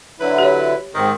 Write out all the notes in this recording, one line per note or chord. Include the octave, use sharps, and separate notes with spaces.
D3 F#3 E4 B4
G4 C#5
G#2 D#3 C4